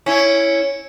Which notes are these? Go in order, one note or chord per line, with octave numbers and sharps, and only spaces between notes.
C#4 E4